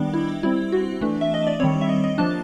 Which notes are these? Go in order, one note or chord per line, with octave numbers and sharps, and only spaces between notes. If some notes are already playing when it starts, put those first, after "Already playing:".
Already playing: D#3 G3 B3 D4
E4
G3 C4 E4
F#4
E3 A3 D4
E5
D#5
D5
D#3 G3 C4 C#5
E5
D#5
D#5
F3 A#3 D4 A5